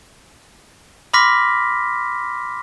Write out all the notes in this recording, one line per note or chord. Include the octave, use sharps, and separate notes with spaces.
B5 C6 D6 F6 A#6 B6